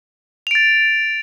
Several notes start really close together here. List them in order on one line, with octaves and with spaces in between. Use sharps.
F7 D7 A6